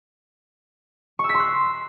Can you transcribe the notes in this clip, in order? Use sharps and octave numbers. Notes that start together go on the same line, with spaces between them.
C#6
E6
B6
C6
F#6